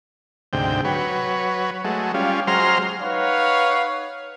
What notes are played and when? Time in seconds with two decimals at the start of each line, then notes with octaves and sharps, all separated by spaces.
0.53 D2 G#2 C3 G5
0.85 F#3 B4 C#5
1.84 F#3 G#3 A3
2.14 G3 C#4 F4
2.47 F#3 G#3 C5 A#5 C6 F6
3.02 D#4 B4 C#5 F5 F#5